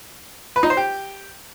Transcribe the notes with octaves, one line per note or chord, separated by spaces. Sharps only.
B4
D#4
C5
G4